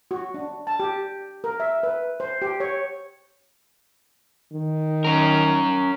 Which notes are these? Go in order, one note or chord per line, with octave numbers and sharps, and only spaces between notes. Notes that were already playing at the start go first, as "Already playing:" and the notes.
F#4
D4
A5
G4
A#4
E5
B4
C5
G4
C#5
D#3
C#4 A#4